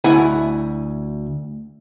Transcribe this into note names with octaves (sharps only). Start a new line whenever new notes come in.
D2 E4 F#5 G#5